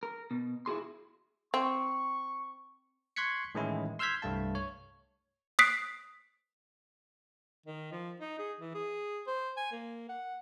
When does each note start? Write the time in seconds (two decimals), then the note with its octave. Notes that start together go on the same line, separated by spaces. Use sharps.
0.03 A#4
0.31 B2
0.66 E4 F#4 G#4 C6
1.54 C4 C#6
3.16 C6 C#6 F#6 G#6 B6 C#7
3.55 A2 D#3 E3 G#3 C#4 E4
3.99 C6 E6 F6 G6 G#6 B6
4.22 C2 G2 A3 F5 A5
4.55 C#5
5.59 D#6 F#6 B6 C7 D7
7.66 D#3
7.92 F3
8.20 D#4
8.39 G#4
8.60 E3
8.75 G#4
9.27 C5
9.57 G#5
9.72 A#3
10.09 F#5